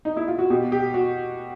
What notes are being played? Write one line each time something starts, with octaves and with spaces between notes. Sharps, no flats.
D#4
E4
F4
F#4
B2 G4
G4
F#4